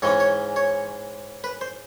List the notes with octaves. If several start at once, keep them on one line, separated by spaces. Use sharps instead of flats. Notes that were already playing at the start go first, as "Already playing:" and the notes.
G#2 E3 G#3 C#4 C#5
C#5
C#5
B4
C5